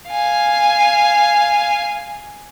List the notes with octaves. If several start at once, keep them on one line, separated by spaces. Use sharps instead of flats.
F5 G#5